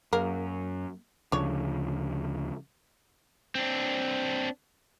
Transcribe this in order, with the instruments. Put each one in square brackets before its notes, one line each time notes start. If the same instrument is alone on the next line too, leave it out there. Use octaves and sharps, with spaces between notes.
[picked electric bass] F#2 [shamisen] A#3 G#4 A#4
[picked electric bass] D2 C#3 F3 [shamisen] D4 C#5
[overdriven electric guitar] C4 D4